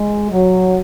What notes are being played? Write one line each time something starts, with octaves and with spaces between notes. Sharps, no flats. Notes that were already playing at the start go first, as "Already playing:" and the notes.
Already playing: G#3
F#3